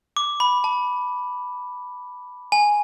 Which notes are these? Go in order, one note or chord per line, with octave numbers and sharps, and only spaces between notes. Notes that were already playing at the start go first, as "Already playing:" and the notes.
D6
B5
A5
G#5